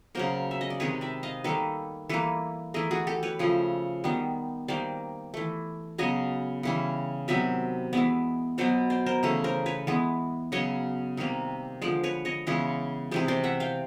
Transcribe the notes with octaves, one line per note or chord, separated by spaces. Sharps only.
C#3 F#3 A#3 A#4 C5
E5
D#5
D5
C3 D#3 G#3 B4 C#5
D5 E5
D#5 F5
D#3 G3 A#3 A4 B4
E3 G3 A#3 A4 B4
E3 A3 G#4 A#4
F#4 G#4
G4 A4
B4 C#5
C#3 F3 A3
D#3 G3 B3
D#3 G3 A#3 C5 D5
E3 A3
C#3 F#3 B3 C#5 D#5
C#3 E3 G3
C3 D#3 F#3 B3 D5 E5
E3 G#3 B3 D5 E5
B2 F#3 B3 C5 D5
C5 D5
A#4 C5
C#3 E3 A3
A#4 C5
B4 C#5
E3 G#3 B3
C#3 F#3 B3 C#5 D#5
C3 D#3 G3 A#3
D3 F3 G#3 C5 D5
B4 C#5
C#5 D#5
C#3 E3 G#3 B3
C3 E3 G#3 C5 D5
C5 D5
E5 F#5
F5 G5